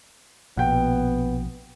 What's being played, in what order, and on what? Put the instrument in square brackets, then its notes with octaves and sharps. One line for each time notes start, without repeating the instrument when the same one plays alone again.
[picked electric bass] A#1 B2 [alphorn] B3 [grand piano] F#5 G5